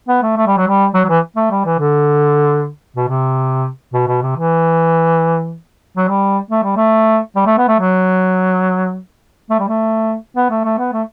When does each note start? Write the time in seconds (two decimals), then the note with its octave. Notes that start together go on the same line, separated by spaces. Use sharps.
0.08 B3
0.23 A3
0.37 A3
0.47 G3
0.57 F#3
0.68 G3
0.94 F#3
1.05 F#3
1.09 E3
1.36 A3
1.51 G3
1.66 E3
1.79 D3
2.96 B2
3.08 C3
3.93 B2
4.08 B2
4.22 C3
4.36 E3
5.97 F#3
6.08 G3
6.51 A3
6.63 G3
6.77 A3
7.36 G3
7.46 A3
7.58 B3
7.68 A3
7.79 F#3
9.50 A3
9.60 G3
9.68 A3
10.36 B3
10.50 A3
10.64 A3
10.79 B3
10.93 A3